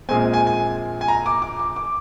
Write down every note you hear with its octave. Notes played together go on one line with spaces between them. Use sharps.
A#1 A#2 G#3 C4 G#5
G#5
G#5
G#5
A#5
D6
D6
D6
D6